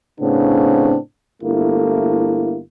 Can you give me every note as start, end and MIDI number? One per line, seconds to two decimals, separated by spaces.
0.20 0.97 45
0.20 0.97 49
0.20 0.97 59
0.20 0.97 60
0.20 0.97 62
1.42 2.58 31
1.42 2.58 57
1.42 2.58 58
1.42 2.58 64